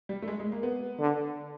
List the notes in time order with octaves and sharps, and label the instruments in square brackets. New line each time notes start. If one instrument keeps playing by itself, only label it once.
[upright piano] G3
A3
G#3
G#3
A#3
B3
[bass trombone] D3